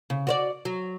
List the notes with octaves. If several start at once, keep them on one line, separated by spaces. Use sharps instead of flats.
C#3
F#4 C#5 D5
F#3